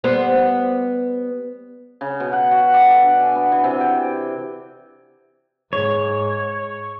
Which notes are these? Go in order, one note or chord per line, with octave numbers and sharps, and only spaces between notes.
G3 B3 C5
C#3
B2
F#5
F#4
D5
A4
D4
G#5
B3
E3
C3
G5
G#2 C#5